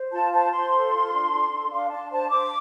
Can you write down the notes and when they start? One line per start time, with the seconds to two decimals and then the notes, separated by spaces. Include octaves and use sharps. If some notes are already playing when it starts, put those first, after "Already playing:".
Already playing: C5
0.12 F4 A5
0.32 C5 A5
0.52 C5 C6
0.72 A4
0.92 F4
1.12 D4
1.31 A4
1.51 D4
1.71 D4 F5
1.90 D4 A5
2.11 C5 A5
2.30 C5 D6